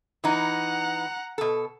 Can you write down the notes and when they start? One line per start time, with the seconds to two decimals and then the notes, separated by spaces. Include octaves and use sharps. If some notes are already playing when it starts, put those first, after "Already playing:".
0.24 E3 D#4 F#5 A#5
1.38 B2 A4